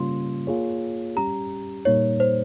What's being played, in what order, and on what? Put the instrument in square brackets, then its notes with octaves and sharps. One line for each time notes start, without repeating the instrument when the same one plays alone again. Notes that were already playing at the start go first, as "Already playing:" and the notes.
Already playing: [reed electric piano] C#3 G3 A#3 C#4 F4 [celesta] C6
[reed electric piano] A#3 F4 G#4 C#5
[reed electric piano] G3 C#4 G4 [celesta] A#5
[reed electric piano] A#2 G3 A#3 D#4 [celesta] C#5
[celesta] C5